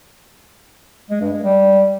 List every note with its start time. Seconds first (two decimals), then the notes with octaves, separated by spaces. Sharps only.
1.10 G#3
1.21 G2
1.32 G#3
1.44 G3